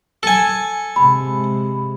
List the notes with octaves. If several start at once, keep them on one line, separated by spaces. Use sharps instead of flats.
A4 G#5
C3 G#3 B5